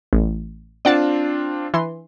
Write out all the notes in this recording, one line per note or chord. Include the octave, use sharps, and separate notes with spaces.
A1
C4 D4 F4 D5 F#5 A5
E3 C6